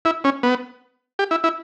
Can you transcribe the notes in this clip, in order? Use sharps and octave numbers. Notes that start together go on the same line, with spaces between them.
E4
C#4
B3
G4
E4
E4